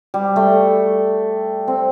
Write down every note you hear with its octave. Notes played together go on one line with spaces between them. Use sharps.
G3
A3
C4